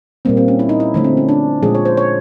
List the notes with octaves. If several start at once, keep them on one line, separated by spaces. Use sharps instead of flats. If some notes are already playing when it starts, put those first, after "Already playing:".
A#2 G3 A#3 C4
C4
C#4
E4
D#4
E4
D3 F3 A3
C4
C#4
D4
A#2 F3 G#3 G#4
C#5
C5
C#5